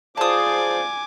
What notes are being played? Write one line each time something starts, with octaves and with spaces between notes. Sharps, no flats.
F4 G#4 C5 D5 G#5 A5 D6 D#6